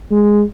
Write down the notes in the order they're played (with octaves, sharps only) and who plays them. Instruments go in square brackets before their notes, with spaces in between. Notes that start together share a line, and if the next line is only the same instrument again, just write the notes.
[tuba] G#3